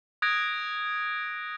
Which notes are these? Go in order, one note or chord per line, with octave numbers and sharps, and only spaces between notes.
D#6 F#6 G#6 A#6 D7